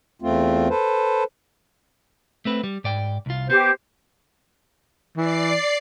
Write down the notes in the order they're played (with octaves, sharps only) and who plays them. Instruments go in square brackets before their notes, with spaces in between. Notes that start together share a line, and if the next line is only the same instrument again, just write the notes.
[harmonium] E2 A3 C4 F4
A4 B4 C5
[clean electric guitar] A3 C4 B4
G3
G#2 D5 G5
C2 F4
[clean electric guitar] B3 [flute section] G4 [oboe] C5
[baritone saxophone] E3 [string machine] D5 C7